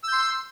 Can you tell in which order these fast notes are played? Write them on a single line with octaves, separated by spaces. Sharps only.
E6 G6 C6